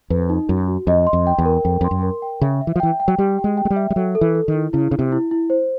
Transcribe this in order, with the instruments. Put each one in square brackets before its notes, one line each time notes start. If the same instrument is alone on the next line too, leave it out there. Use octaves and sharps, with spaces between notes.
[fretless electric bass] F2 [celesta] B4
[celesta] D#4
[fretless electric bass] F#2 [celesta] F#4
[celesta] F#4
[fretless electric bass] F2 [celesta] D#5
[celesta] C6
[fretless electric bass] F2
[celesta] G5
[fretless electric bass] E2
[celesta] A#4
[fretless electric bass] F2 [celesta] G5
[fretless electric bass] F2 [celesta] C6
[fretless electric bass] F#2
[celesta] A#4
G5
[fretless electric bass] C#3 [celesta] E5
[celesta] E5
[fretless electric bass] E3
F3
[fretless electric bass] E3 [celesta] G5
[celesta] G5
[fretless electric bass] F#3
[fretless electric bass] G3 [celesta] G4
[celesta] G5
[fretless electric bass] G#3
[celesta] G5
[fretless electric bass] G#3
G3
[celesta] E5
[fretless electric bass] G3
[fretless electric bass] F#3 [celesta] A4
[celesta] A4
[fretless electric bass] E3
[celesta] A4
[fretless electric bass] D#3
[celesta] E4
[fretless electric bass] C#3 [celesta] E4
[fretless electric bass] C#3 [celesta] E4
[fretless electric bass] C3
[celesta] E4
E4
C5